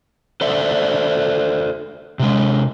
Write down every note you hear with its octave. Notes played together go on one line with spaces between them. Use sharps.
A4 C5 D5 E5
C3 G#3